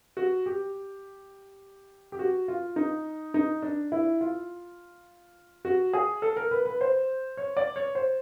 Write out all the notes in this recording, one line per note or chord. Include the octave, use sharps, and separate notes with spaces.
F#4
G4
G4
F#4
F4
D#4
D#4
D4
E4
F4
F#4
G#4
A4
A#4
B4
B4
C5
C#5
D5
C#5
C5